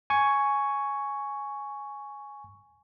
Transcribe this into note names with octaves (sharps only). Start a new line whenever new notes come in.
G#5 C#6